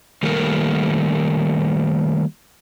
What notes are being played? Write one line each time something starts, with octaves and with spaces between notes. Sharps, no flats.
D#3 G3 A3 A#3 A#4